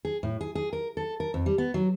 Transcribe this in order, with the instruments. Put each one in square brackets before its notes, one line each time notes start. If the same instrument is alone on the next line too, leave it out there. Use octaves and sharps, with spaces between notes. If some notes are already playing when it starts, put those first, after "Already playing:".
[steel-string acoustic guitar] G#4
A2
G#4
G#4
A#4
A4
A#4
F2
G3
B3
F#3